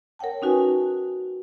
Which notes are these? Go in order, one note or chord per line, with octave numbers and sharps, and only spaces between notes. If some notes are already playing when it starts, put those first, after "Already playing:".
A#4 C#5 F#5 G5 A5
C#4 D#4 F#4 B4 G#5 A5